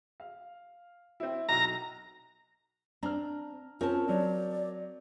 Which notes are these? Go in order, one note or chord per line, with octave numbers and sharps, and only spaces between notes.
F5
C4 E4
B1 A#5
C4 D4 A#5 F6
C4 C#4 F4 A#4 A5
F#3 C4 D5